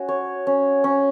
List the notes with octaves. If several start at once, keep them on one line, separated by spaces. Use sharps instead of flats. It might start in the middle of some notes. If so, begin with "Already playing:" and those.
Already playing: C#4 F#4
C#5
C#4
C#4